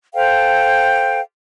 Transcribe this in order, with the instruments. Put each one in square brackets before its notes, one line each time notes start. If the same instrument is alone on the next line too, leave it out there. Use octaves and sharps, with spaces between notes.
[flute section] A4 C5 F5 G5